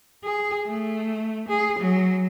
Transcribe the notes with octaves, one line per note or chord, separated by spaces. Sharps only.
G#4
A3
G#4
F#3